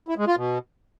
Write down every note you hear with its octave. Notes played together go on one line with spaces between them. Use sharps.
E4
G#3
F4
B2